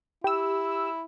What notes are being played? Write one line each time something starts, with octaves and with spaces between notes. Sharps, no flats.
E4 G4 E6